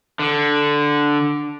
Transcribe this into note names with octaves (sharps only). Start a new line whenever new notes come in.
D3